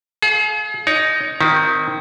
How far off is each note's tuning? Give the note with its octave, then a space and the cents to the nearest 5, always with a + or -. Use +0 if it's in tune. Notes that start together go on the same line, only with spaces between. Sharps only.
G#4 +40 F5 +0
D#4 +0 C#5 +35
D#3 +0 C4 -10 E4 -40